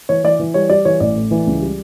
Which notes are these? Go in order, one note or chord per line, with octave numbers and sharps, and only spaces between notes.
E3 C#5
E3 D5
E3
G3 C#5
G3 D5
E3 C#5
A1 D5
A2
E3
C#2
G3